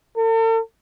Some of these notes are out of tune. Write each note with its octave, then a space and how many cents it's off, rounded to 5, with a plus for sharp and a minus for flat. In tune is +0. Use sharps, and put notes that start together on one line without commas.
A4 +45